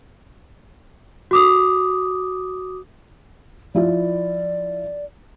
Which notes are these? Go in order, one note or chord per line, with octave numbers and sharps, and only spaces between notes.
F#4 D6 D#6
F3 E4 F4 D5